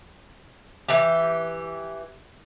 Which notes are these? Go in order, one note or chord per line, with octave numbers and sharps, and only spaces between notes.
E3 G4